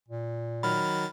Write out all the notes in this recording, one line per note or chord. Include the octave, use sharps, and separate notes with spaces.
A#2
D#3 F#3 B5 F6 A6